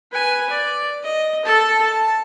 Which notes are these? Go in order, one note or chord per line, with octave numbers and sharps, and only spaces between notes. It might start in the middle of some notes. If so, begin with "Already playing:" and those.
B4 G#5
D5
D#5
A4 A5
A5